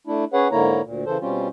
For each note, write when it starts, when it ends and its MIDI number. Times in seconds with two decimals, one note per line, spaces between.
0.07 0.24 57
0.07 0.24 62
0.07 0.24 64
0.33 0.48 61
0.33 0.48 68
0.33 0.48 71
0.33 0.48 73
0.33 0.48 78
0.52 0.81 44
0.52 0.81 50
0.52 0.81 58
0.52 0.81 64
0.52 0.81 73
0.52 0.81 82
0.84 1.05 38
0.84 1.05 46
1.06 1.18 49
1.06 1.18 52
1.06 1.18 69
1.06 1.18 72
1.20 1.48 47
1.20 1.48 55
1.20 1.48 60
1.20 1.48 61
1.20 1.48 65